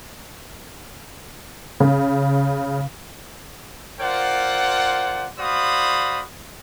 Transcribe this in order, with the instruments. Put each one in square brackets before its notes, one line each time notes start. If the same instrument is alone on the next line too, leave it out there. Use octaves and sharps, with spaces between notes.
[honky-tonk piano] C#3
[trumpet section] F4 A#4 C5 D5 F#5
F#4 C5 D5 F5 B5 D#6